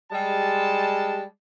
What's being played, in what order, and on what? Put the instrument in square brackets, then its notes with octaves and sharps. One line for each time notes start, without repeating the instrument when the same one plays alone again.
[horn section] G3 G#3 A5